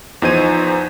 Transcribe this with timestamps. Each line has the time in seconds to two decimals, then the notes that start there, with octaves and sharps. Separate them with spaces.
0.22 E2 F3 D#4 C5 G#6 D#7